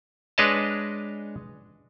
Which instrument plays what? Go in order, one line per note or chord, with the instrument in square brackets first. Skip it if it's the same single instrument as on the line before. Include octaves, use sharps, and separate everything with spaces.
[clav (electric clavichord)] G#3 D4 B4 C#5 D#5 A5